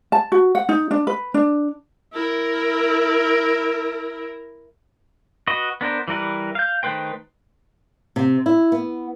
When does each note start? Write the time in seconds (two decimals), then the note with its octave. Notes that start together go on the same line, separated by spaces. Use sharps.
0.12 A5
0.32 F#4
0.55 F#5
0.69 D#4
0.91 D4
1.07 B4
1.34 D4
2.13 E4 A#4
5.47 F#4 B4 D#5
5.81 B3 D4 A#4 C5
6.08 E3 G3 A#4 B4
6.55 F5 G6
6.83 D#3 A3 B4 C5 G5
8.16 C3
8.46 E4
8.72 B3